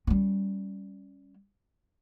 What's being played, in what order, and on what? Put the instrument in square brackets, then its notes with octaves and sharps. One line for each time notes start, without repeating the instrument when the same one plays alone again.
[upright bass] G3 C#4